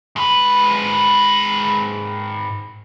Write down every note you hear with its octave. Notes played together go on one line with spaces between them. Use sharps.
G#2 B4